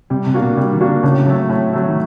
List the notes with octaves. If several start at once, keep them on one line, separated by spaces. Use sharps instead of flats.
C3 G3
C3
A#3 D4 F#4
B2
C3 G3
D#3
A#3 D4 F#4
D3
A2 C#3
F#3 A3
A2
F#3 A3
D#3